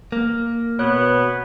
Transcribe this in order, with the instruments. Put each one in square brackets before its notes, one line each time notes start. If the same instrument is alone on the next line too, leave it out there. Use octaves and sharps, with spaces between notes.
[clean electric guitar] A#3
[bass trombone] B2 [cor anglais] B3 [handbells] C#5 F#6